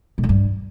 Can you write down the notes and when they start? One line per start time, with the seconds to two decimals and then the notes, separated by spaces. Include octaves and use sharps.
0.18 B2
0.23 F2
0.29 G2